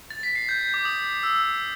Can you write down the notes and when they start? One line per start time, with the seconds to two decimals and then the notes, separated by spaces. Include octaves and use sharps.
0.10 A6
0.23 B6
0.35 C7
0.49 G6
0.74 D6
0.85 D#6
1.23 E6